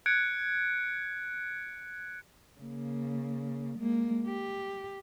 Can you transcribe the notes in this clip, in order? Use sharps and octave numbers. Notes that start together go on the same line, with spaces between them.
F#6 G#6 C#7 D7
C#3 A#3
G#3 A#3
G4